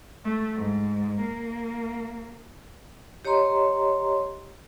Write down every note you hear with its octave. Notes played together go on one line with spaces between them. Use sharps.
A3
G#2
A#3
G4 C#5 D#5 A#5 C6